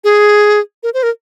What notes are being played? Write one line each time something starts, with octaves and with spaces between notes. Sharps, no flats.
G#4
A#4
C5
A#4